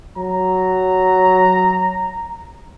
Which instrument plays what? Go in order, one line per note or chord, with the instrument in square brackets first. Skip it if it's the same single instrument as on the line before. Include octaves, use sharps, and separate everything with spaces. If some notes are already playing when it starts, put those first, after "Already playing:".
[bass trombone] F#3 [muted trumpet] A#5